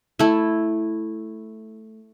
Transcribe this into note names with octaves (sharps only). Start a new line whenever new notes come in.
A3 E4